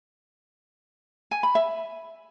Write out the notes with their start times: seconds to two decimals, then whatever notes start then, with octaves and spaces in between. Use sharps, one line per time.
1.31 G#5
1.43 B5
1.55 E5